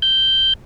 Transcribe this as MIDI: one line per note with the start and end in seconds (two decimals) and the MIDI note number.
0.02 0.53 91